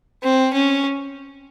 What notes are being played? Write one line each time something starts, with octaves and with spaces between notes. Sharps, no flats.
C4
C#4